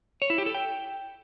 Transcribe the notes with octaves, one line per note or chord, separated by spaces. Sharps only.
C#5
E4
G4
A4
G5